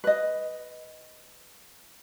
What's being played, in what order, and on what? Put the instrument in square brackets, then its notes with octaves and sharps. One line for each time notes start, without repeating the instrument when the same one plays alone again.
[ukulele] B4 D#5